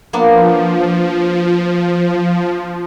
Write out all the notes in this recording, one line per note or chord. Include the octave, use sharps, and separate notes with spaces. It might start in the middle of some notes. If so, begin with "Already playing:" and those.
F3 A#3 B3 D4